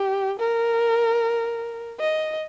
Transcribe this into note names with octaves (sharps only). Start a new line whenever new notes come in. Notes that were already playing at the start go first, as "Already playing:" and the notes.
Already playing: G4
A#4
D#5